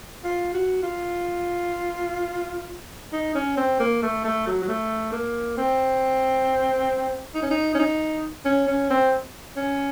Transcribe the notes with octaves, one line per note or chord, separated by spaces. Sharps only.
F4
F#4
F4
D#4
C#4
C4
A#3
A3
A3
F#3
F#3
A3
A#3
C4
D#4
C#4
D#4
C#4
D#4
C#4
C#4
C4
C#4